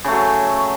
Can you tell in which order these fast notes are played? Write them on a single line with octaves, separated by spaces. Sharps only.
C#3 A3 F#3